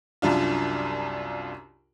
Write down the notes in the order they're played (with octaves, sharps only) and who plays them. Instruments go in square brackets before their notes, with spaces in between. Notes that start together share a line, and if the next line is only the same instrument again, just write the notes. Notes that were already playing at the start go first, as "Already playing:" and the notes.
[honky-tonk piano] C2 F#2 D4 F4